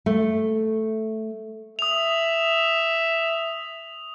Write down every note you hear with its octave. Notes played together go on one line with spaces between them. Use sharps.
A3
E5 D#6 F7